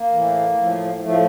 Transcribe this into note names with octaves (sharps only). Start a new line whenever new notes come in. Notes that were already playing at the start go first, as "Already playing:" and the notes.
Already playing: A#3
A2 E3
A2 F3
A2 F3 A3